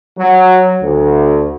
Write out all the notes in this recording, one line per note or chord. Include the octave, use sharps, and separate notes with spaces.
F#3
D2